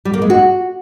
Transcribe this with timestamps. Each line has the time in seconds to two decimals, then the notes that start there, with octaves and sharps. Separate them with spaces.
0.05 G3
0.14 A#3
0.22 G#3
0.30 F#4